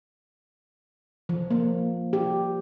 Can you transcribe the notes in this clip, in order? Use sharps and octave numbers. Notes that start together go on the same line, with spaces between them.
F3
A#3
G4